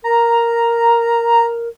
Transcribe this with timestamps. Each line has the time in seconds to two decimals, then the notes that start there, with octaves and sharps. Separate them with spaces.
0.04 A#4 A#5